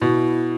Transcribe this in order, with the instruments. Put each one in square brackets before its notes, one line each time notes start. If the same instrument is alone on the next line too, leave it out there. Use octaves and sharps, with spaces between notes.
[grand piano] B2 [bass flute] E4